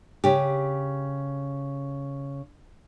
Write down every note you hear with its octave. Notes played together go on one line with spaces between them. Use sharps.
C#3 G4